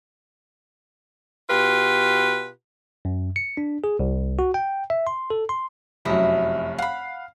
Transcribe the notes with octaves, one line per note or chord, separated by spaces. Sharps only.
B2 F4 G4 B4
F#2
C#7
D4
G#4
C2
F#4
G5
E5
C6
A4
C6
F1 F#2 E4 D#5 E5
F5 F#5 B5